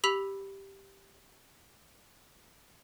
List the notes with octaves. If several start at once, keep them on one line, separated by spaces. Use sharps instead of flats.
G4 B5 E6 B6 F7